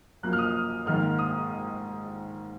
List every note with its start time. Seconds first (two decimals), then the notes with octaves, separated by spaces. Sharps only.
0.23 F#2 F3 A#3 F#6
0.33 F6
0.38 D#6
0.86 G#2 D#3 A#3 F6
1.19 D#6